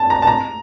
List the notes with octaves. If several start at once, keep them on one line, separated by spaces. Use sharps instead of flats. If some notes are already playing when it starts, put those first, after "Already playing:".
Already playing: A5
A#5
A5
A#5